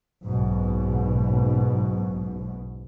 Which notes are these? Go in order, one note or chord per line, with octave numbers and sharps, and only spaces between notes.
F#1 B1 G#2 B2